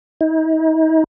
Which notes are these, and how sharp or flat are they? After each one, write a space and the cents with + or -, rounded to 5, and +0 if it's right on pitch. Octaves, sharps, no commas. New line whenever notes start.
D#4 +40